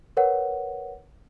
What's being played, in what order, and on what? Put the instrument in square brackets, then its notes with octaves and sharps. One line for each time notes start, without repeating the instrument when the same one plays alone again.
[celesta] A#4 B4 C#5 F#5